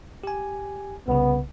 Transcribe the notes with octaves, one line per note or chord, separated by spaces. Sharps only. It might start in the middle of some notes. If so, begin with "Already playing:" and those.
G4 G#5
C2 C#3 B3